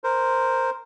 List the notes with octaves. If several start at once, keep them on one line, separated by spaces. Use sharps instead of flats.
A#4 C5